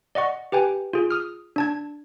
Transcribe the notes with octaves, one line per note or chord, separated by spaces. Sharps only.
D5 D#5 F#5 C#6
G4 B4 G5 G#5
F4 G#4
D#6 F6
D4 A5 G#6